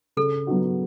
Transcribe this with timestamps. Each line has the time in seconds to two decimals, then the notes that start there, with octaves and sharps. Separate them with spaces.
0.17 C#3 A4
0.47 F#3 B3 D#4 F#4